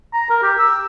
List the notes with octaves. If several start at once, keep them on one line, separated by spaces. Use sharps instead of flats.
A#5
A#4
G4
E6